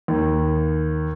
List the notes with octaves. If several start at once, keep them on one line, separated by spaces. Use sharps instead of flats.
D#2